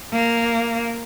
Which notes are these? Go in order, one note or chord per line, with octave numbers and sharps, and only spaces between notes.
A#3